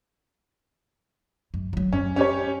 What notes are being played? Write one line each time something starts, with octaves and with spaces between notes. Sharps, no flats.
F#2
F3 F#3
F#2 C#4
C#4 G4 C#5